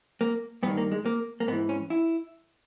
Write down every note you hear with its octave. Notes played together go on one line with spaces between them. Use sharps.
A#3
G2 D#3 B3
A#3
G#3
A#3
A#3
G#2 E3 B3
C#4
E4